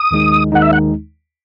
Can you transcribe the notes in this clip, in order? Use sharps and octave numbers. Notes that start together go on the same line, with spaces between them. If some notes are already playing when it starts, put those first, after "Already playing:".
Already playing: D#6
D#2 D#3 G#3 D#4
D#2 D#3 G#3 D#4 F#5
E5
F#5